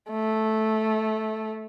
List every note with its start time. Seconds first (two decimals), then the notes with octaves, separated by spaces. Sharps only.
0.11 A3